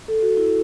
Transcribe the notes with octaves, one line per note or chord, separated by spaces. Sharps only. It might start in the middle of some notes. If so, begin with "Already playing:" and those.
A4
F#4
E4